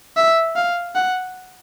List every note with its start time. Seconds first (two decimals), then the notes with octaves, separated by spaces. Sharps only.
0.17 E5
0.56 F5
0.95 F#5